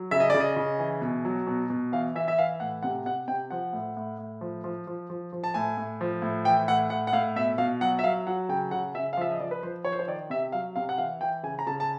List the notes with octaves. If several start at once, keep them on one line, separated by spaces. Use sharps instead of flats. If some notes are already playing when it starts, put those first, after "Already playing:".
Already playing: F#3
C#3 E5
D#5
D5
C#3
D#5
C#3
E3
B2
F#3
B2
B2
E3 F5
E3 E5
E5
E3 F5
A2 F#5
C3 F#5
C3 F#5
C3 G5
F3 F#5
A2
A2
A2
F3
F3
F3
F3
F3
A5
A2 G#5
A2
F3
A2
E3 G5
A2 F#5
A2 F#5
F#5
A2 F5
B2 E5
B2 F5
F#3 F#5
E5
F#3 F5
F#3 F#5
C#3 G5
C#3 F#5
C#3 E5
F5
F3 E5
D#5
F3 D5
B4
F3 C5
F3 C#5
C5
C#5
D#3 D5
C3 E5
F#3 F5
C3 F5
F#5
E3 F5
E3 G5
C#3 G#5
A#5
C#3 A5
A5